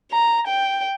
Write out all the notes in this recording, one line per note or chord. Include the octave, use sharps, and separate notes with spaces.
A#5
G5